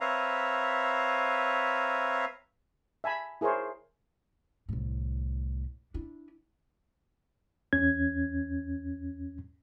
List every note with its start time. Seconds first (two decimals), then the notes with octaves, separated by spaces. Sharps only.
0.01 C4 B4 C#5 E5 F5 A#5
3.04 E5 G#5 A5 B5
3.41 E4 G#4 A#4 C5 C#5
4.69 C2 A2
5.94 D4 E4
7.73 E2 C#4 G#6